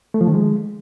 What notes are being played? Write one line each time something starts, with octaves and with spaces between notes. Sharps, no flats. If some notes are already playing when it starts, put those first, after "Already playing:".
A3
F3
D#3
G#3